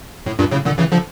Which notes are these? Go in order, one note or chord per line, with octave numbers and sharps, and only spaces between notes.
A2
G2 A#2
A2 C#3
A#2 D3
C#3 E3
D3 F3